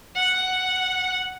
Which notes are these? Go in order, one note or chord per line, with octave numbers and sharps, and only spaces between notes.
F#5